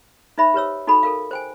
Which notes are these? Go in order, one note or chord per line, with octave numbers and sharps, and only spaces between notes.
D#4 C5 E5 B5
G4 B4 C#5 E6
D#4 F#4 A4 B5
A4 A#4 F5
C5 G5 G#5